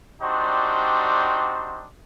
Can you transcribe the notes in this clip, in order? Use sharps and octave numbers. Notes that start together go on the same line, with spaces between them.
G3 C4 D4 D#4 F#4 C5